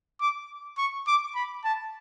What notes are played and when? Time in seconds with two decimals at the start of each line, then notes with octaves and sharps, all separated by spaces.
0.21 D6
0.78 C#6
1.07 D6
1.35 B5
1.64 A5